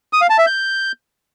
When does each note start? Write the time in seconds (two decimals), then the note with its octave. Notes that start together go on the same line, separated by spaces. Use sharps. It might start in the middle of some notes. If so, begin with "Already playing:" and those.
0.13 D#6
0.21 F5
0.30 A5
0.38 E5
0.47 G6